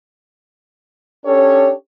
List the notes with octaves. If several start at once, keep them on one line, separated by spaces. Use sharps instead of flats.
C#4 D4 G4 A4 C#5